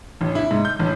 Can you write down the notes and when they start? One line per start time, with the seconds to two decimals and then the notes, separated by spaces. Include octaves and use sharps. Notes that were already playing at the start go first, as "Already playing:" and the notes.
0.21 A1
0.35 E4
0.51 G#2
0.65 G6
0.79 A1